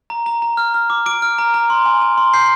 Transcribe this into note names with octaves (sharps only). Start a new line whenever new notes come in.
A#5
A#5
A#5
F6
F6
D6
D6 D7
F6
A#5
A#5
C6
G#5
G#5
C6
G6 C7